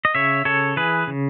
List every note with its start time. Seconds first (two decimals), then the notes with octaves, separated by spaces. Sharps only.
0.05 D#5
0.15 C#3 C#5 E5
0.45 C#3 A4 C#5
0.76 E3 G#4 B4
1.07 C#3